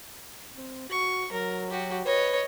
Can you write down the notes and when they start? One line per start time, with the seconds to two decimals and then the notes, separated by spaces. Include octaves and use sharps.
0.56 C4
0.90 F#4 C#6
1.32 F#3 A#4
1.70 F#4 G4
2.06 B4 C#5 D#5